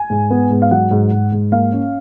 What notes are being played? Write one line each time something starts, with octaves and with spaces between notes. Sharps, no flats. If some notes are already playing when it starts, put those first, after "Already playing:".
Already playing: G#5
G#2
B3
G#2
F5
F#3 F#5
G#2
G#2
G#2
A#3 F5
C#4